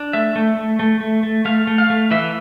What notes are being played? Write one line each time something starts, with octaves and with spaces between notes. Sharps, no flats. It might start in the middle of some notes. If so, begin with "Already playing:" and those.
Already playing: D4
A3 E5
A3
A3
A3
A3
A3
A3 F5
A3
F5
A3
E3 E5